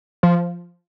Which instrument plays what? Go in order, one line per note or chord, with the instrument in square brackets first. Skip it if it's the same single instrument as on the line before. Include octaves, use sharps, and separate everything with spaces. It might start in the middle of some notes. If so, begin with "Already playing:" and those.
[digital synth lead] F3